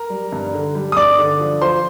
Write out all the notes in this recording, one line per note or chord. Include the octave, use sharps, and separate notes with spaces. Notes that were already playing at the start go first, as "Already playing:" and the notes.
Already playing: A#4 A#5
G3
G2
D3
G3
D#6
G2 D5 D6
D3
F3
F3 C5 C6